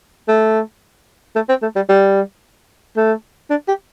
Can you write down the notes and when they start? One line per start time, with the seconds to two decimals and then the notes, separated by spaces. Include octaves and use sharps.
0.28 A3
1.35 A3
1.49 C4
1.62 A3
1.76 G3
1.89 G3
2.97 A3
3.50 D4
3.68 G4